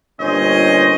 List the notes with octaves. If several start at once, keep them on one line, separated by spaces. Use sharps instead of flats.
G1 A#2 C#4 C5 C#5 D#5